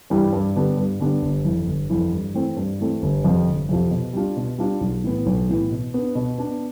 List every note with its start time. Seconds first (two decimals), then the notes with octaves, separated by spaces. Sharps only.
0.10 G2 E3 G3
0.33 G2
0.56 D3 G3 B3 D4
0.77 G2
1.00 D3 G3 B3 D4
1.22 G1
1.45 F2 E3
1.67 G1
1.90 F2 E3
2.11 G2
2.34 E3 A3 C4
2.57 G2
2.80 E3 A3 C4
3.02 G1
3.24 F2 C3 F3
3.47 G1
3.69 F2 C3 F3
3.91 B2
4.13 G3 D4 F4
4.37 B2
4.58 G3 D4 F4
4.81 B1
5.04 A2 E3 B3
5.26 B1
5.49 A2 E3 B3
5.72 B2
5.94 B3 D4
6.15 B2
6.38 B3 D4